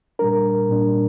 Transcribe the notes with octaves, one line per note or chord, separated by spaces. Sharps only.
A#2 G3 D4 A#4
A#2 G3 D4